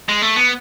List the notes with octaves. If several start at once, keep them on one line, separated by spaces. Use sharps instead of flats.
G#3
A3
B3